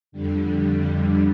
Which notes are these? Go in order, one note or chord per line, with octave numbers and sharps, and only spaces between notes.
F2 D3 G3